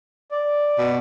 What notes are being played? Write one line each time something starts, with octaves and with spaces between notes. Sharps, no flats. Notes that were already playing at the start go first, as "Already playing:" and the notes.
D5
B2